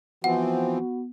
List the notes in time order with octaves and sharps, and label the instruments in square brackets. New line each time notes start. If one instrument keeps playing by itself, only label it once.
[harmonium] E3 F3 C4 [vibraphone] B3 [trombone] F#4 [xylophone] F#5